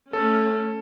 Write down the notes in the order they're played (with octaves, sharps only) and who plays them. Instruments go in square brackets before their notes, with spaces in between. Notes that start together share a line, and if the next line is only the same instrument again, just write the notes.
[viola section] A3 C#4 [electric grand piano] A4